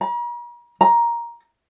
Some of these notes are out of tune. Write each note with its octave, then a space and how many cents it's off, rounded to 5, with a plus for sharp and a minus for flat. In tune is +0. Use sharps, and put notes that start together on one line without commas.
A#5 +45
A#5 +10